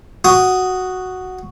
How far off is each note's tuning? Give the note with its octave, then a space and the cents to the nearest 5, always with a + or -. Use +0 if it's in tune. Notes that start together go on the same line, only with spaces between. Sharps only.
F#4 +0 D#6 +0